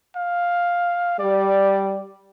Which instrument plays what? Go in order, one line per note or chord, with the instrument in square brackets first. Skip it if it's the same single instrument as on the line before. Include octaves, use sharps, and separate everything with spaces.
[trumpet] F5
[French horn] G3 [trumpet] D5